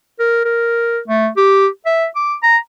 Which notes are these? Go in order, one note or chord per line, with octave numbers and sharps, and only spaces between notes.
A#4
A#4
A3
G4
E5
D6
A#5